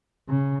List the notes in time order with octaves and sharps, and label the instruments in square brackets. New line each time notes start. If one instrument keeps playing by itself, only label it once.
[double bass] C#3